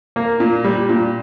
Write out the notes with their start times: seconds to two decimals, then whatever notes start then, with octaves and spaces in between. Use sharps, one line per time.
0.16 A#3
0.40 A#2
0.64 G3
0.89 A#2